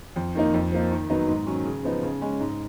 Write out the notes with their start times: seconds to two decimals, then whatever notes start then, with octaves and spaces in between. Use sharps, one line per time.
0.16 F2
0.35 D#3 A#3 D#4
0.54 F2
0.72 F3 A#3 D#4
0.91 D#3
1.10 F#3 B3 D#4
1.28 G#2
1.47 D#3 F#3 C#4
1.65 C#3
1.84 F3 B3 D#4
2.03 C#3
2.22 G#3 C#4
2.40 G#2